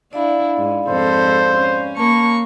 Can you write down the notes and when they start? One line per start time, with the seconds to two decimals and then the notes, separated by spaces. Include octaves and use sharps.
0.13 D4 E4 D5 F5 B5
0.57 G#2
0.89 F2 G#2 A4 C5
1.55 C#4
1.97 A#3 A5 B5 C#6